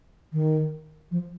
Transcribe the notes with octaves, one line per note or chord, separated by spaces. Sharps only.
D#3
F3